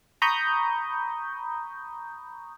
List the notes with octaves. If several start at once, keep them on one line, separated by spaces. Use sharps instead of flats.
A#5 B5 C#6 D#6 G6